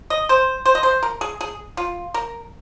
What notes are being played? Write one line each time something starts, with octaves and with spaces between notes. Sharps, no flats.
D#5
C5
C5
D#5
C5
A#4
G#4
G#4
F4
A#4